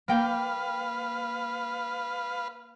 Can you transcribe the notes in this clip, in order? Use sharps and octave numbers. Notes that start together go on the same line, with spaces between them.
A#3 B4 F5 G5